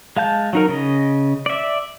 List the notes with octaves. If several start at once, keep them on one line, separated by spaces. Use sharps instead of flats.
G#3 F5 A5 G6
F#3 D#4 A#4
C#3 D#5
D5 E5